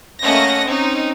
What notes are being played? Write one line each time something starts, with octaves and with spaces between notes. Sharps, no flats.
A3 A#3 C#4 D#5 F#5 A#6
C4 C#4 D#4